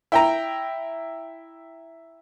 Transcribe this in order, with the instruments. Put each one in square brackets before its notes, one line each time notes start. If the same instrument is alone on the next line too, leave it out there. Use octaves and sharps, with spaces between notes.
[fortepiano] E4 G5 A#5